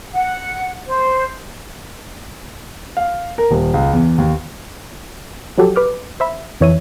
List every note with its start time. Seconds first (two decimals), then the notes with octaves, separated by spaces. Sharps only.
0.12 F#5
0.87 C5
2.97 F5
3.38 A#4
3.51 D#1
3.74 C#2
3.93 E2
4.18 D#2
5.58 F3 F#3 F#4 G4 A4
5.76 B4 D6 F6
6.20 C5 E5 B5
6.60 F2 E3 C#5 E5 D#7